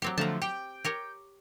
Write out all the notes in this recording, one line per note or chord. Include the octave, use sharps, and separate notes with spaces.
F#3 C4 G4
D3 F3 A3 A5 A#5
G4 G5
G4 A#4 C#5